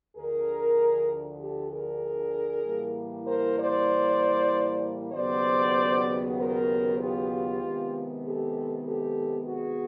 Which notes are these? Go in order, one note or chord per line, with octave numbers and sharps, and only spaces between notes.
D2 D3 F3 G#4 A#4
G4 A4
G#4 A#4
A2 E3 G3 A#3
A#4 C5
C5 D5
D#2 C#3 F#3 B3 C5 D5
A#4 C5
F4 G4
C3 D#3 G#3 B3
G4 A4
G4 A4
F#4 G#4